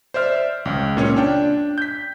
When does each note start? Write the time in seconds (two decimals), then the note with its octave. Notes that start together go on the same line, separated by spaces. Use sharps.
0.14 C5 D5 E5 F6
0.65 C#2
0.97 A#2 C#4 C#5
1.17 D4 G5
1.78 G6 B6